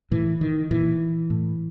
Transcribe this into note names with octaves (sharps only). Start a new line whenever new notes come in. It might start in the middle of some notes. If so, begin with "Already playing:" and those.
A2 E3
D#3
A#2 E3
A2